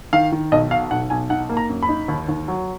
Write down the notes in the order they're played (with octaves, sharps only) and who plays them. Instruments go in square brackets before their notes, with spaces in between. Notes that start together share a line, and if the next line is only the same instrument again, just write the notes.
[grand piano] D#3 F5
D#3
B1 D#5
B2 F5
B1 F#5
B1 G#5
D#4 F#5
A#3
A#5
F#2
B5
D#4
D#2
D#2
F#3